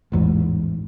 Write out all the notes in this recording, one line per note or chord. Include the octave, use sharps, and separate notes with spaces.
A1 E2 G#2